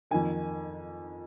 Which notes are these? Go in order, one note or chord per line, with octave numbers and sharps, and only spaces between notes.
F2 D#3 A#3 G#5